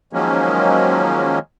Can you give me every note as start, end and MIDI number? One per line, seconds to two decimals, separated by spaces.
0.13 1.39 51
0.13 1.39 53
0.13 1.39 54
0.13 1.39 56
0.13 1.39 58
0.13 1.39 61